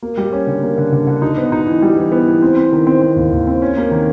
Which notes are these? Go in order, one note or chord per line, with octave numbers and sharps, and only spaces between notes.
A#3
G3
C#4
D3
A#3
D3
D3
D3
D#4
B3
D#4
E3
G3
E3
B3
E3
C4
C4
D#3
C4
C4
D#2
D#2
C4
C#4
A#3
D#3